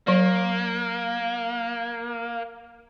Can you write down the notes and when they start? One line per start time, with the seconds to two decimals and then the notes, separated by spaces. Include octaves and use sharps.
0.07 F#3 A#3 D5